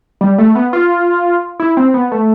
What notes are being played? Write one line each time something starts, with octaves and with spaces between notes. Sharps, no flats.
G3
A3
B3
F4
E4
C4
B3
A3